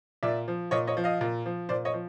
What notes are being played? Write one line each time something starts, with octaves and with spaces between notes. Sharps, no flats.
A#2 D5 E5
F3
A#2 C#5 D#5
C#5 D#5
F3
D#5 F5
A#2
F3
A#2 C5 D5
C#5 D#5
F3